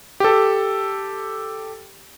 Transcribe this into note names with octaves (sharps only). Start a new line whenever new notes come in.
G4 A4